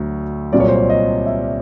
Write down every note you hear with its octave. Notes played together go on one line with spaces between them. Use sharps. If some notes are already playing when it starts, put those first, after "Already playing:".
Already playing: D2 D3 F#3
C2 A#2 F#3 D5
C#5
C5
C#5
D#5
E5